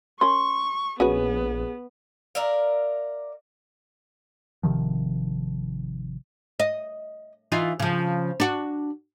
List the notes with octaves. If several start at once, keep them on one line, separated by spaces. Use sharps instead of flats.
C#4 A#4 C6 C#6
A#1 B3 C#4 F#4 G#4 B4
A#4 D5 E5 F5
G#1 C3 D#3 F3
D#5
E3 D#4 F4
C#3 F3
D4 F#4